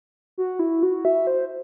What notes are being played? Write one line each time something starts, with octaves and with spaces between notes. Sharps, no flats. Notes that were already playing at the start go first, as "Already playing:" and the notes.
F#4
E4
F#4
E5
C5